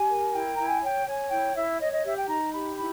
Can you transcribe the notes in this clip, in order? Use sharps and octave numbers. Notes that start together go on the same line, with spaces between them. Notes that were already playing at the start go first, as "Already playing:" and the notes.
Already playing: G4 G#5
A#4
E4 G5
E4 A#5
G#5
C#5 G5
C#5 G#5
E4 G5
E4 E5
C#5 D#5
D#5
G4 E5
G5
D#4 A#5
G4 B5
E4 B5